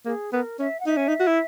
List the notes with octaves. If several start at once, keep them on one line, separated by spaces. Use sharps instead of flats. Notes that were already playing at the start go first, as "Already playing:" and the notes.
A#3 G#4
B3 A#4
C#4 E5
F#5
D#4 E5
C#4
D#4
F#4
E4